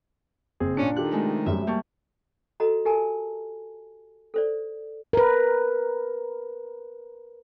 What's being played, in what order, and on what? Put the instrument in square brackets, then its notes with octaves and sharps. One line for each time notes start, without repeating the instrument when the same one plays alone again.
[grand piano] F#1 [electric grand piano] C4 G#4
[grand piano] A#2 F4 C#7 [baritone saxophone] C#4 [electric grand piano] D4
[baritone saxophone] D#3 [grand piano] F4 G4 A4 [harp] F#6
[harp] C3 G#3 A3
[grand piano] F#2 G3 [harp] E5 E6
[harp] G3 A#3 [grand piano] A5 C#6 G6
[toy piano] F#4 A4 D#5 A#5
G4 A4 A#4 G#5 A5
A4 C5 D5
[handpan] A#4 B4